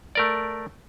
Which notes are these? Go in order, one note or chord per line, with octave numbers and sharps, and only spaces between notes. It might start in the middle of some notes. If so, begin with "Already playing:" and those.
A3 A#4 D5